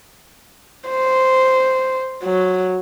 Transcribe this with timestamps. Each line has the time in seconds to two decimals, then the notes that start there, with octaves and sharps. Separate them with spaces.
0.89 C5
2.24 F#3